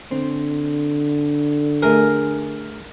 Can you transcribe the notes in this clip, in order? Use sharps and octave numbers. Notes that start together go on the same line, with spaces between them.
D3 C4
A3 G#4 A#4